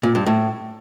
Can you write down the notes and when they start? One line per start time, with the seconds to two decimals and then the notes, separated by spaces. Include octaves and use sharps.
0.03 A#2
0.15 G2
0.26 A2